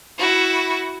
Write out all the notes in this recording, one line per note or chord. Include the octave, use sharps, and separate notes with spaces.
E4 F#4